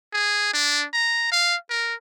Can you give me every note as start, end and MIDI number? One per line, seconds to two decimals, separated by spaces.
0.13 0.51 68
0.53 0.85 62
0.93 1.28 82
1.32 1.56 77
1.70 1.94 70